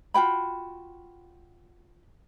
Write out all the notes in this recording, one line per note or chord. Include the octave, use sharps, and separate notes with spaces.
F4 F#4 G5 B5